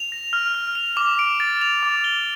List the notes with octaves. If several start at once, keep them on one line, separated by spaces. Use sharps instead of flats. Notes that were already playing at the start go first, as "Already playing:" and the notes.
Already playing: F7
A#6
F6
F6
F7
D6
D7
A6
F7
D6
G7